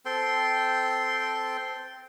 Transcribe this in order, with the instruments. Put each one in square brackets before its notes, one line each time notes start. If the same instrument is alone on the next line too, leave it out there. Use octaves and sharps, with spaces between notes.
[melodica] C4 A4 G5 C6